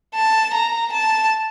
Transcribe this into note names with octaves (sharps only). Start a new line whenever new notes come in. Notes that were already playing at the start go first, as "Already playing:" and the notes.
A5
A#5
A5